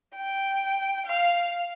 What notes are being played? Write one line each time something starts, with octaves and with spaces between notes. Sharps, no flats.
G5
F5